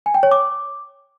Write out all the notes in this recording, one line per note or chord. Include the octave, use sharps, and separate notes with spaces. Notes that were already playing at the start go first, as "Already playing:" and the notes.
G#5
G5
C#5
D6